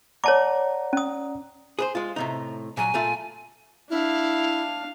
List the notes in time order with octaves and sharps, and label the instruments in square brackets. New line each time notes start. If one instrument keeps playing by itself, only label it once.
[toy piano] C#5 A5 D6 [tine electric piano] D5 F#5 A#5
[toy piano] C#4 D#6
[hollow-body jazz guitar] G#4 B4 C5
G#3 F4
A2 C3 D#4
[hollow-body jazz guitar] A#2 F#3 [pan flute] G#5
[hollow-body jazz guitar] A#2 A3 F4
[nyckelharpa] D4 F5 [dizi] E4